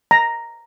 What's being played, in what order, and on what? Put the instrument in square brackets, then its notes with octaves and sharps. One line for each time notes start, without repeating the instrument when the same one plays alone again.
[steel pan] A#5